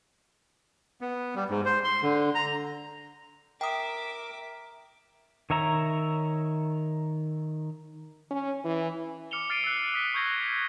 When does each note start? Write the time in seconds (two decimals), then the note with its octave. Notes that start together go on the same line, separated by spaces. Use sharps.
1.01 B3
1.35 G3
1.49 G#2
1.66 C5
1.84 C6
2.03 D3
2.35 A#5
3.61 A#4 E5 G5 D6 D#6
5.50 D#3 C#5 E5 A#5
8.31 C#4
8.64 E3
9.31 D6 F6 C#7 E7 F7 G7
9.50 F6 A6 C7 D7 D#7
9.64 E6 F#6
9.94 D#6 B6 G7
10.14 C#6 G6 G#6 A#6